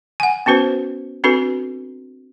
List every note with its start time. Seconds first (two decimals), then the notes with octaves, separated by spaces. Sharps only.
0.20 F#5 G#5
0.46 B3 C#4 F#4 B4 C5
1.24 C4 D4 F#4 A4 B4